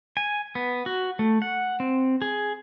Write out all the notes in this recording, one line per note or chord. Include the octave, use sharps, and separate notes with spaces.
G#5
B3
F#4
A3
F#5
C4
G#4